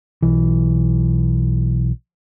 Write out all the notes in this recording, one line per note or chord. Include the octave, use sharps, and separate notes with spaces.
B1 E3